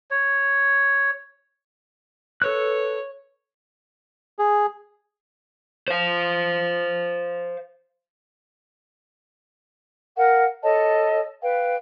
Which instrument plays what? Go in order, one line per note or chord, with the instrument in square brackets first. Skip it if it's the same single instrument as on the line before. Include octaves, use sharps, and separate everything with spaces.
[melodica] C#5
[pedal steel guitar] A4 B4 F#6 [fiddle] C#5
[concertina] G#4
[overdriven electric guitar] C5 F5
[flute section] A#4 F5 F#5
A4 C#5 D#5 A5
B4 F5 G5